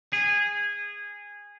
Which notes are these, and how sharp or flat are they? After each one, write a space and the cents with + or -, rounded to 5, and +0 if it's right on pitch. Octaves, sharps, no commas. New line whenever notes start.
G#4 -15